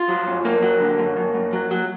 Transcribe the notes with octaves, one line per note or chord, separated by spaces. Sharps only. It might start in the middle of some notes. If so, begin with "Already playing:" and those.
Already playing: F4
F#3
F#2
F#2 A#3
F#3
D3
F#2
F#2
F#2
F#3
F#3